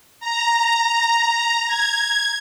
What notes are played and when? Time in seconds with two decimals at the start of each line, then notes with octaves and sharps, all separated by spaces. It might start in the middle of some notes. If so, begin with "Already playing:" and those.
0.20 A#5
1.67 G#6